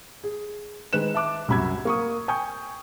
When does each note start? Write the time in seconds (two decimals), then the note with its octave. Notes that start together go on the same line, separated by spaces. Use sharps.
0.24 G#4
0.93 D#3 G#3 B4 F#6 E7
1.14 E5 A5 D6 F#6
1.48 C2 F#2 F#4 B5 E6 G#6
1.85 A#3 C#6 D#6
2.28 G5 G#5 C#6 D#6 G6